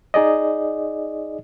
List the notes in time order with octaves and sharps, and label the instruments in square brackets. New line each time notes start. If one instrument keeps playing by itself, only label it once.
[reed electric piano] D#4 G#4 D5 D#5